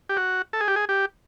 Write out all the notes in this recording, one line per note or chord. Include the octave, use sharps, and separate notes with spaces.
G4
F#4
A4
G#4
G4
G#4
G4